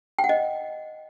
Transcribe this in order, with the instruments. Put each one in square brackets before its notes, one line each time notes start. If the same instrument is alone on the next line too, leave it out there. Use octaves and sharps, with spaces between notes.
[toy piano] G5
F#5
D#5